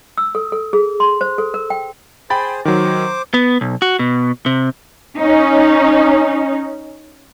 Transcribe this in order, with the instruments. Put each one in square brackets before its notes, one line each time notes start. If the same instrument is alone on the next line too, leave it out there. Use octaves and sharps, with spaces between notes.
[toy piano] E6
A4
A4
G#4
C6
C5
A4
A#4
G5
[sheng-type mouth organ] G#4 C5 [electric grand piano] G5 B5 A6
[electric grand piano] D#3 F#3 [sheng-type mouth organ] C5 D6
[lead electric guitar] B3
B1
F#4
B2
C3
[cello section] C#4 D#4